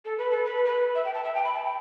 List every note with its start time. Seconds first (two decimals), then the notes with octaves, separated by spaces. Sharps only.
0.05 A4
0.18 B4
0.31 A4
0.45 B4
0.65 B4
0.95 E5
1.05 G5
1.14 A5
1.24 E5
1.34 G5
1.44 B5
1.54 A5
1.64 G5